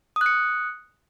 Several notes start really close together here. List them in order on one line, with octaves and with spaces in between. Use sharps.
D#6 F#6 C#7